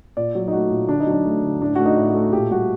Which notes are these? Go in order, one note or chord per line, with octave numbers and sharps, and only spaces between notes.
A#2 D5
F#3
D#4
A3 F#4
A#2
D3 D4
D#4
F#3 D4
A3
D3
A2 D4
A3 F#4
D#4
A2
F#4
A3
A#2 G4
G3 F#4